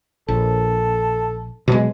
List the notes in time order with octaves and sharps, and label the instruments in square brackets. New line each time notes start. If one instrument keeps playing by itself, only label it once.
[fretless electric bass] A#1 [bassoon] A4
[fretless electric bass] B2 F#3 G#3